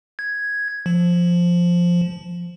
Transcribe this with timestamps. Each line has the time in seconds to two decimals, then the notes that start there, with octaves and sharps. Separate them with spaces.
0.19 G#6
0.86 F3